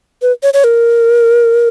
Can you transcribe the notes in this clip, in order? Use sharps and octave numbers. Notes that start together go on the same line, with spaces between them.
B4
C#5
C#5
A#4